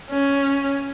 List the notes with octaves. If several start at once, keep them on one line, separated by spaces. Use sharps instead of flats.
C#4